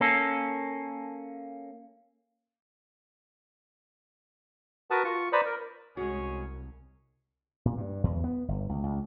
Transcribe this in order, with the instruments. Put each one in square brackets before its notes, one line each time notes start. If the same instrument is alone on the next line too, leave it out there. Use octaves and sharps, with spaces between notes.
[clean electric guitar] A#3 C#4 A4
[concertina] F#4 A#4 B4 F#5 A5 D#6
F4 C#6
B4 C5 D5 A#5 B5 D#6
A#4
[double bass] C2 [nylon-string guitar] G#3 F#4 [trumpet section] C#4 G#4 C#5
[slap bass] A#2
G2
E2
B3
G1
C#2
C#2